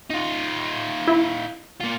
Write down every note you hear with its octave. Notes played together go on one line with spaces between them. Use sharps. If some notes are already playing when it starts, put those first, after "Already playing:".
D#4 F4
E4
A#3 F4